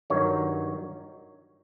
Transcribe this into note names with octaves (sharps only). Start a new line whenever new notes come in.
G2 D#3 F#3 C#5